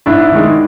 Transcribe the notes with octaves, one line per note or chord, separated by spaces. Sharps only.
G#2 D4 E4
D#3 G#3